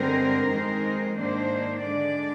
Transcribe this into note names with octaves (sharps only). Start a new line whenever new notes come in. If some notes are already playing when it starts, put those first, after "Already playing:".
Already playing: G2 D3 G#3 C4 A#4
F2 D#3 G#3 C4
G#2 D#3 A#3 D4 C5
D3 G#3 D4 D5